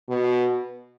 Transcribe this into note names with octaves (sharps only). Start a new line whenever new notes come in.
B2